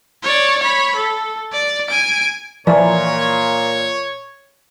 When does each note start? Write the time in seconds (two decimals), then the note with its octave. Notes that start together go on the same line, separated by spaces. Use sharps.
0.23 C#5 D5
0.59 C#5 B5
0.95 A4
1.53 D5
1.89 G#5 D7
2.67 A#2 E3 F3 C#5 D5 E5 G#5